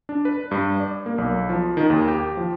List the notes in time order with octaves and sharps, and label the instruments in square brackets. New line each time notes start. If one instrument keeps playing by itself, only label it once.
[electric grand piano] D4
B4
G2
D5
A#3
B1
F3
D#3
D#2
G4
F3